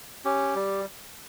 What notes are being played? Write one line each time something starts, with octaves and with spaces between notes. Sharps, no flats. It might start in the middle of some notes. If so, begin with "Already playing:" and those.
C#4 G4
G3